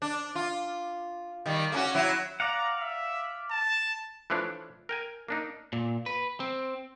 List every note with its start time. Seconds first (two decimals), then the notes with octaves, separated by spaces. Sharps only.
0.02 D4
0.35 F4
1.46 D#3 G3
1.72 A#3 C#4 F#4
1.95 F#3 E4
2.40 D5 F5 F#5 A#5
2.80 E5
3.51 A5
4.30 E3 F3 A3 D4 C#5
4.89 A#4 G5 G#5
5.28 A#3 D4 D#4
5.73 A#2
6.06 B4
6.40 C4